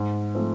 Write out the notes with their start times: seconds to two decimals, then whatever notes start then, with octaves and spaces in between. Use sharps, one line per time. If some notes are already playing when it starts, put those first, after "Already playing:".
Already playing: G#2
0.35 F3 A3 C4